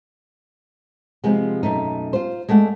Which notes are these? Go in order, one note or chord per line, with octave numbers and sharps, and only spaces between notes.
C3 F3 G#3 B3
F#2 B2 A3 D#4
F4 C5
G#3 A3 D5 F5 F#5